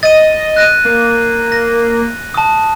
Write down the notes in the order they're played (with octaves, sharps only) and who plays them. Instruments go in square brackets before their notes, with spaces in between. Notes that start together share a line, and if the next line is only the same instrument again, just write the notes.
[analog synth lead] D#5 [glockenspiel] A6 D#7
[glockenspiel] F#6 A#6 D#7
[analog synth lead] A#3
[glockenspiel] A#6
A5 D#6